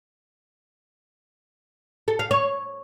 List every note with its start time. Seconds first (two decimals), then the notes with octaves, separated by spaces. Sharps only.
2.08 A4
2.19 F5
2.31 C#5